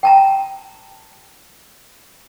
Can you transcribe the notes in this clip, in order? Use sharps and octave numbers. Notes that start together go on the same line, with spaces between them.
G5 A5 A#5